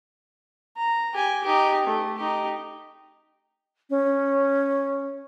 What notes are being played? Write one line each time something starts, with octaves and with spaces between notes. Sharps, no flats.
A#5
G4 G#5
D#4 G4
A3
D#4 G4
C#4